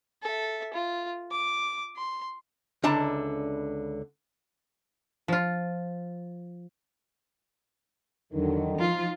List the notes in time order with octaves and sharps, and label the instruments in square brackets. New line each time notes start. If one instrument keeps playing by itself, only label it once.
[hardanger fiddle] A4 E5
F4
D6
C6
[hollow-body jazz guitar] C#2 D3 D4 E4 A5 A#5
[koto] F3 F4
[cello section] E2 F#3 [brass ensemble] D3 D#3
[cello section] F3 D#4 F4